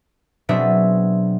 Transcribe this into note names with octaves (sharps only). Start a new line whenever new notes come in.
B2 F#3 C4 D4 G#4 E5